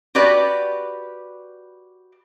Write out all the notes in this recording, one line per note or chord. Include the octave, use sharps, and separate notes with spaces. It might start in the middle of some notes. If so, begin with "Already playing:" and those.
F#4 G4 B4 D5